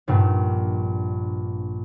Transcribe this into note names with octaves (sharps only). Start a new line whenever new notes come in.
A#1 G2 A#2